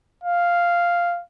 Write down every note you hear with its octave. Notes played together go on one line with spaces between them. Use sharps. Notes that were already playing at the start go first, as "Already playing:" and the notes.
F5